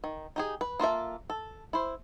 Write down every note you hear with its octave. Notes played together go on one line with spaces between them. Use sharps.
D#3
D#4 G4 G#4
B4
A#3 F4 A4 E5
A4
E4 C5